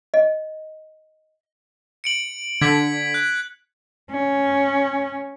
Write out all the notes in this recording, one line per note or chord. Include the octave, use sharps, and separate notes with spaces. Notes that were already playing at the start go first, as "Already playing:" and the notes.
D#5
C#7 D7 F#7
D3 G#6 B6 F#7
F#6
C#4